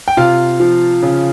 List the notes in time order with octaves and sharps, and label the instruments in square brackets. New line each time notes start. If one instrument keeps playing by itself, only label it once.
[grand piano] G5
C3 F4 F5
F3
C#3